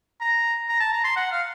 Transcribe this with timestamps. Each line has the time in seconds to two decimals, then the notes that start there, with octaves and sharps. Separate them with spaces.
0.21 A#5
0.69 A#5
0.81 A5
0.93 A#5
1.04 C6
1.16 F#5
1.32 F5